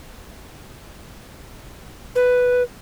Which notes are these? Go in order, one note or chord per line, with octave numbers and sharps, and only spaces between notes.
B4